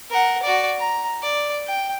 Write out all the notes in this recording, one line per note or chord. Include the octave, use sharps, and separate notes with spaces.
A#4 F#5
F#4 D5
A#5
D5
G5